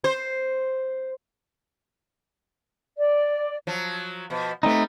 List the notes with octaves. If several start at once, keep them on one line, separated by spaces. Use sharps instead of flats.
C5
D5
F3 F#3
B2 F3
G3 A3 B3 C4 D#4